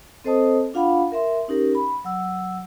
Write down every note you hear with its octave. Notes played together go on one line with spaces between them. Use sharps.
C4 A4 C5 D#5 A5 D#6
D4 F4 F5 F#5 B5
A#4 E5 C6
C#4 D#4 G4 A#4
B5
F#3 F#5 E6